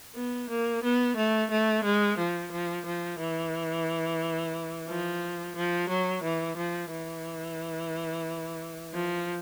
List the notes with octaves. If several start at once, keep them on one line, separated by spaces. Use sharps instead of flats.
B3
A#3
B3
A3
A3
G#3
F3
F3
F3
E3
F3
F3
F#3
E3
F3
E3
F3